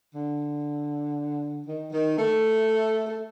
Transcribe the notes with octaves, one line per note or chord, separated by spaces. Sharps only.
D3
D#3
D#3
A3
A3